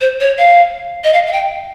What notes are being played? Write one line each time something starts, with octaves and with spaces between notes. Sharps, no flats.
C5
C#5
F5
D#5
F5
F5
G5